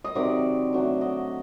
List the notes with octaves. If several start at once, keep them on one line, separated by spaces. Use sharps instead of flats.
D#5
C3 D#3 F#3 D5
D3 F#3 A3
D#5